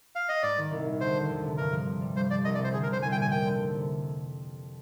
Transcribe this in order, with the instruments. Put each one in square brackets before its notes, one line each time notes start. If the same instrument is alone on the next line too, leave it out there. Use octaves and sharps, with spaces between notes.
[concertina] F5
D#5
[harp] G#2 [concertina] D5
[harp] D#3
C2
A#2
[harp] D2 [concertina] C5
[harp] D3
F2
C3
[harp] G2 [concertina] A#4
[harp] F3
C3
G3
[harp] G2 [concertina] C5
[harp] F3 [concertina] D5
[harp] C2 [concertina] D#5
[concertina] D5
[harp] C3 [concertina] C5
[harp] D3 [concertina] G#4
[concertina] A#4
[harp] G3 [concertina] C5
[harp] C2 [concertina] G#5
[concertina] G5
[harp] A#2 [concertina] G#5
[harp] F2 [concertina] G5
[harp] D3
F2
C3